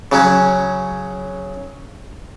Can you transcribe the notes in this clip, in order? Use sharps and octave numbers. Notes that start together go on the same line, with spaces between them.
C#3 F#3 C#4